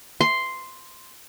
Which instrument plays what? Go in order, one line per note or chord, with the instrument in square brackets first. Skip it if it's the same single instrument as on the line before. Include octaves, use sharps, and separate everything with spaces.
[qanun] C6